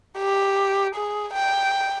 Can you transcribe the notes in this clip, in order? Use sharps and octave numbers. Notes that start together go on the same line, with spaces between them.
G4
G#4
G5